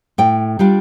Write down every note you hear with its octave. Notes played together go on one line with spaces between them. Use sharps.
A2 G5
G3 D4 F4